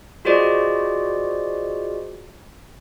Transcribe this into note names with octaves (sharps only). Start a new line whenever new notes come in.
F4 F#4 G#4 C5 D5 D#5